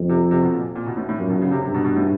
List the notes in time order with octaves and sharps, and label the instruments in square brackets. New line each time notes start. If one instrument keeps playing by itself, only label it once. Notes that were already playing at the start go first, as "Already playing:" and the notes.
Already playing: [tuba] F2
[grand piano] C3
C3
B2
A#2
A#2
B2
A2
A2
[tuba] F#2 [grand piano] A#2
[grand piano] B2
C#3
C3
[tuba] G2 [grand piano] C3
[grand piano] B2
B2
A2